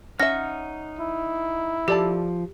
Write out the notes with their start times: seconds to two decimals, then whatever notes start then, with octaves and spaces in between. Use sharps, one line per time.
0.20 C#4 D#4 E5 F#5 F6 A#6
0.99 E4
1.88 F3 G4 A4 D5 A5